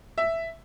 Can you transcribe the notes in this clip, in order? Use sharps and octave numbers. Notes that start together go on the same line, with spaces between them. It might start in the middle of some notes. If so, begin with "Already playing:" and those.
E5